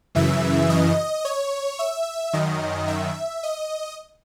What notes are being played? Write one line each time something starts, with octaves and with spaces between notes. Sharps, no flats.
F#2 C#3 E3 E5
D#5
C#5
E5
F#2 D#3 D#5
E5
D#5